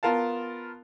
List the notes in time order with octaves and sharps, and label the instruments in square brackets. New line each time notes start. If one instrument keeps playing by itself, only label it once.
[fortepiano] B3 F4 A#4 F5 A5